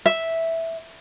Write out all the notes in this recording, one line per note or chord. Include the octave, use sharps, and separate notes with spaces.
E5